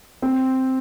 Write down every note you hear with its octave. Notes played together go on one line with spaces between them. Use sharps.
C4